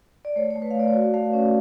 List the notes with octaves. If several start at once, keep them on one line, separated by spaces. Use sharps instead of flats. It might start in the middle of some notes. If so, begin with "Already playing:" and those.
D5
A3 C#5
C#5
A3
B4
F5
A3 D5
C#5
F#4
A3 F5
C#4